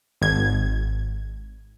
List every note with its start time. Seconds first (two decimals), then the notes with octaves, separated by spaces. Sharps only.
0.22 G#1 G#6